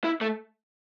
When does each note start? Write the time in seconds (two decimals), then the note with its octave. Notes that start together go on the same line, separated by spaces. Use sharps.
0.04 E4
0.21 A3